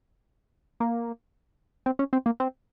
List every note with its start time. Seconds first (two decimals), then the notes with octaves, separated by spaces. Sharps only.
0.80 A#3
1.86 C4
1.99 C#4
2.13 C4
2.26 A#3
2.40 C4